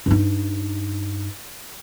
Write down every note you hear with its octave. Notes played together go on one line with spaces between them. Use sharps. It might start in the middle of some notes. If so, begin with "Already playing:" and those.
G2 D#4